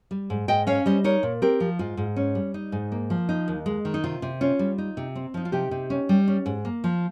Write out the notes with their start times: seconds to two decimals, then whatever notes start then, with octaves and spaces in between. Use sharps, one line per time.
0.11 G3
0.30 G#2
0.48 G#2 D#5 G5
0.67 C#4 C#5 F5
0.86 G3 C5 D#5
1.04 D#4 A#4 C#5
1.23 A#2
1.42 C4 G4 A#4
1.60 F3
1.79 G#2 F4
1.97 G#2
2.16 C#4
2.35 G3
2.54 D#4
2.72 G#2
2.92 A#3
3.10 F3
3.29 D#4
3.48 D#2
3.66 G#3
3.85 D#3
3.94 D#4
4.04 C3 F4
4.22 C3
4.41 C#4 F4
4.59 G3
4.78 D#4
4.97 C3
5.15 C4
5.34 F3 D#4
5.45 F4
5.52 C3 D#4 G4
5.71 C3
5.90 C#4
6.09 G3
6.28 C#4
6.46 G#2
6.65 A#3
6.84 F3